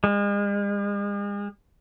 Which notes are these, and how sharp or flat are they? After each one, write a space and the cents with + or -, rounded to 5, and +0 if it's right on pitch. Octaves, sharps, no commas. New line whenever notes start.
G#3 -40